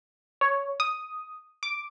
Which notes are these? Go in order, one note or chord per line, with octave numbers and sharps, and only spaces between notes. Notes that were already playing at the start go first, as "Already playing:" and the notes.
C#5
D#6
D6